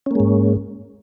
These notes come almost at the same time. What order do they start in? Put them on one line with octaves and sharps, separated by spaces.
C#4 A#3 G#3 G#2